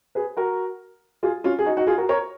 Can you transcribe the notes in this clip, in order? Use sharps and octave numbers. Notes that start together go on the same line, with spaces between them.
G#4 B4
F#4 A#4
F4 G#4
C#4 F4
G#4
D#4 F#4
D#4 F#4
F4 G#4
F#4 A#4
A#4 C#5